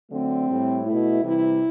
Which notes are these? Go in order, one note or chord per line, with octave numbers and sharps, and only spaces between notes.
D3 F#3 A3 C4
A2 G3
B2 A3 E4
C3 E3 G3 E4